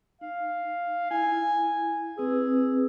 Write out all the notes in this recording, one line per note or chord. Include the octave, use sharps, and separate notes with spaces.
D#4 F5
E4 G#5
C4 G#4 B4 E6